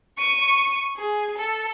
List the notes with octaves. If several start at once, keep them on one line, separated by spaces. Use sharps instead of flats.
C#6 D#7
G#4
A4